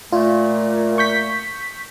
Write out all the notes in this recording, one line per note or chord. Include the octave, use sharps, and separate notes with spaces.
A#2 A3 F4
C#6 G6 B6